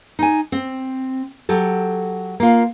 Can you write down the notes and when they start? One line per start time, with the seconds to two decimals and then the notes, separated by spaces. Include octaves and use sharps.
0.19 D#4 G#5
0.52 C4
1.49 F#3 G4 A4
2.40 A#3 F4